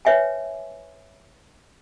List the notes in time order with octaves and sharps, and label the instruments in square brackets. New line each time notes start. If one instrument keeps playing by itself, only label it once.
[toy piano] B4 C#5 E5 G5 G#5